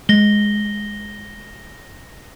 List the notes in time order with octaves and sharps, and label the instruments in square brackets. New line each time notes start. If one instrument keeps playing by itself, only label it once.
[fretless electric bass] G#3 [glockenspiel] A#6 G7